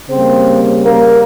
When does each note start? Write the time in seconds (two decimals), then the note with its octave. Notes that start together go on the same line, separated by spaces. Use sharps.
0.10 C#3 G3 A#3 C4 C5
0.84 A#3 A#4